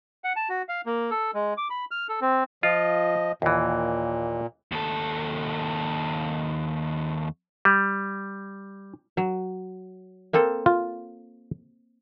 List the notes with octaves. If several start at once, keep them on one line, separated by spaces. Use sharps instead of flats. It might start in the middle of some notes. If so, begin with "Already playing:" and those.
F#5
A5
F#4
F5
A#3
A4
G#3
D6
B5
F6
A4
C4
F3 F4 D#5
D#2 A#2 E3
D#2 A4
G3
F#3
A#3 C4 A4
F4